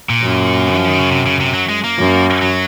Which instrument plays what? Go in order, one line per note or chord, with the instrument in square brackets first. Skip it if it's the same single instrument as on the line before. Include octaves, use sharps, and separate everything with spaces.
[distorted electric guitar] A#2
[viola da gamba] F#2
[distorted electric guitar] F3
D#3
C#3
C3
C#3
C3
F#3
G#3
A#3
[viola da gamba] F#2
[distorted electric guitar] F#3